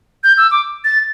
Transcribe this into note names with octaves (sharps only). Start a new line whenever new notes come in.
G6
E6
D6
A6